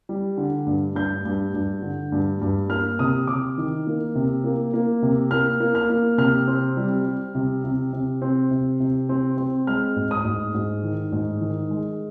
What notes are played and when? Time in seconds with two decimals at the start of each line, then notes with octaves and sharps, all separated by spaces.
0.09 G3
0.37 D3
0.66 G2
0.95 G2 G6
1.25 G2
1.54 G2
1.82 D3
2.12 G2
2.41 G2
2.70 A#3 F6
2.99 C3 D#6
3.27 C3 D6
3.58 D#3
3.87 A#3
4.15 C3
4.44 A#3
4.74 A#3
5.02 C3
5.31 A#3 F6
5.60 A#3
5.75 F6
5.90 A#3
6.18 C3 F6
6.47 C4
6.77 G3
7.05 G3
7.35 C3
7.64 C3
7.93 C3
8.22 C4
8.51 C3
8.80 C3
9.09 C4
9.37 C4
9.67 G#3 F6
9.96 G#2
10.11 D#6
10.25 G#2
10.54 G#2
10.83 D#3
11.12 G#2
11.41 D#3
11.70 G#3